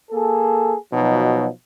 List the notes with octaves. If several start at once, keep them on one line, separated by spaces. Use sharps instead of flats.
A#3 G#4 A4
B2 F3 F#3 D#4